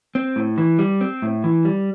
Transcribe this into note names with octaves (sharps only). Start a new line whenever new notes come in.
C4
A2
E3
G3
C4
A2
E3
G3